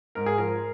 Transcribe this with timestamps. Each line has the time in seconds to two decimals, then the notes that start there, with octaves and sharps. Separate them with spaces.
0.15 G#2 A#4
0.26 G#4
0.38 F3 A#4